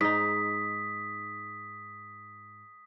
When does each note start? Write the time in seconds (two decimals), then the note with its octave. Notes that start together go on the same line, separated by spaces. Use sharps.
0.01 G#2 D#4 D#6 B6